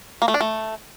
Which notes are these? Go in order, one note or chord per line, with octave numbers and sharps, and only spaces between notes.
A#3
A3
D4
A3